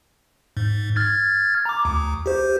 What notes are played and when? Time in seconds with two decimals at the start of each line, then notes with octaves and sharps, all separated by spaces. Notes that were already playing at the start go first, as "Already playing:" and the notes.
0.57 G#2
0.96 F6 G#6 A6
1.65 A#5 D6
1.85 D2
2.26 G4 C5